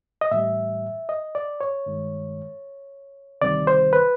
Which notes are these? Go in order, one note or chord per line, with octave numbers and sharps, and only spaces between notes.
D#5
A2 E3 G3 E5
D#5
D5
C#5
G2 D#3 G#3
D2 C3 D#3 G3 D5
C5
B4